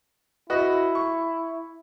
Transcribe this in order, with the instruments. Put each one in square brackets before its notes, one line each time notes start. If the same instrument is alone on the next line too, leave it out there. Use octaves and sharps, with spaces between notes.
[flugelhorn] E4 [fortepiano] F#4 B4 D#5
[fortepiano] C#6